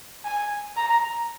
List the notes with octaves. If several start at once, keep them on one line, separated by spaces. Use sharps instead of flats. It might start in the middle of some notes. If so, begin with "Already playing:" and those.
G#5
A#5